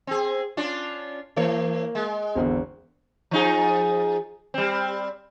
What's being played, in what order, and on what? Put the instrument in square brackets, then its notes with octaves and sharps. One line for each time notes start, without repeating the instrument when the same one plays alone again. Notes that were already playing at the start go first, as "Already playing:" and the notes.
[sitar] C4 G#4
C#4 D4 F4
[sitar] E3 C#5 [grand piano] A#3
[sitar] G#3
[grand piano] G#1 E2 D3
[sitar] F3 D#4 G#4
G3 C4